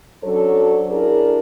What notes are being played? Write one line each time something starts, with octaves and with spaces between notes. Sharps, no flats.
F#3 C#4 D4 A4 C5 C#5
D4 E4 F#4 G#4 A#4